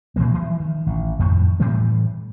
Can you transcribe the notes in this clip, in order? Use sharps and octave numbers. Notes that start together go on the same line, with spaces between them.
A#2 E3 G3 A#3
E3 F3
D#3
A1
F2 A2 D#3
A2 E3 G3 A3